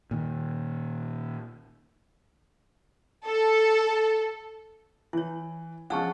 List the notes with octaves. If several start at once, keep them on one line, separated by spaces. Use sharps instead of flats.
A#2 D#3
A4
E3 E4 C#5
F3 G#3 C#4 D4 F#5 A5 C#6 E6